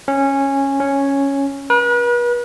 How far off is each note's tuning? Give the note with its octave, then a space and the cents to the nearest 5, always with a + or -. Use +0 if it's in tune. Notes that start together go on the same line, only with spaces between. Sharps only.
C#4 -10
C#4 +0
B4 -40